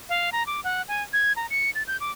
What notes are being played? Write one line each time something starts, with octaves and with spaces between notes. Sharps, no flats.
F5
A#5
D6
F#5
G#5
G#6
A#5
C#7
A6
G6
D6